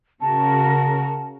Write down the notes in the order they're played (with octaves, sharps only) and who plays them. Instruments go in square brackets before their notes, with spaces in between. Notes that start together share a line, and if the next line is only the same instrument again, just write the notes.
[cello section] C#3 F#4 A#4 [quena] A5